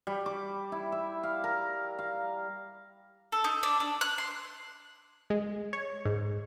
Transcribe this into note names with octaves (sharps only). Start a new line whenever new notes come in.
G3
D6
E4
E5
F5
A#4
F5
A4
D#4
D4
D4
F#6
C6
G#3
C#5
G#2